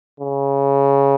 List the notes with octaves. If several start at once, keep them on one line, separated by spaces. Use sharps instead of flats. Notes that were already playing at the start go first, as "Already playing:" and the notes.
C#3